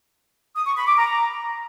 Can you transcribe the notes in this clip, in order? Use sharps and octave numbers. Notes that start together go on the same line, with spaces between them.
D#6
C#6
B5
D6
A#5